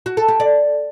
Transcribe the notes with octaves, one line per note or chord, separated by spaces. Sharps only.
F#4
A4
G4
D5